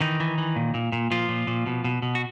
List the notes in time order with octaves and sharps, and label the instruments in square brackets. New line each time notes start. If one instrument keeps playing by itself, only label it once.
[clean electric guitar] D#3 E3 D#4
E3
E3
A#2
A#2
A#2
A#2 F3 F4
A#2
A#2
B2
B2
B2
F#4